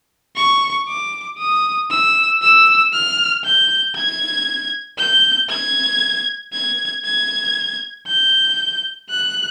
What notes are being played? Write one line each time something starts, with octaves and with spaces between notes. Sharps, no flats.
C#6
D6
D#6
E6
E6
F6
G6
G#6
G6
G#6
G#6
G#6
G6
F#6